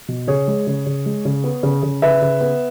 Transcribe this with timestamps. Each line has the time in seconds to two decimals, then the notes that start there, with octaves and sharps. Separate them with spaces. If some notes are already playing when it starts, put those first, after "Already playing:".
0.08 B2
0.27 C#3 G#4 C#5
0.48 G#3
0.67 C#3
0.86 C#3
1.06 G#3
1.25 C#3
1.44 B3
1.63 C#3
1.83 C#3
2.02 C#3 B4 E5
2.22 C#3
2.41 B3